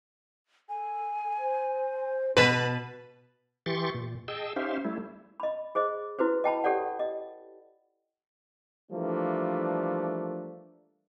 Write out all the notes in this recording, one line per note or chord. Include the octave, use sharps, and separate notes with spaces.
A4 G#5
C5
B2 B3 B4 A5
E3 G4 C6 C#6 A6
A#2
G#4 D#5 G5 A5 E6
C#4 D#4 G4 C5 E5 F5
G3 A3 E4
D#5 B5
G#4 C5 D#5
E4 F#4 B4 C5
D#5 G5 A5 B5
G4 A4 C#5 D5 F#5
D#5
E3 F3 G3 A3 A#3 D4